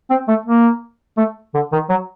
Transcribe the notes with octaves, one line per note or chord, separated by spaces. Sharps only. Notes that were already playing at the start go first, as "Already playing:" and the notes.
C4
A3
A#3
A3
D3
D#3
F#3